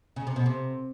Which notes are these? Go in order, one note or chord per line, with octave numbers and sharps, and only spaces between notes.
C#3
C3
B2
C3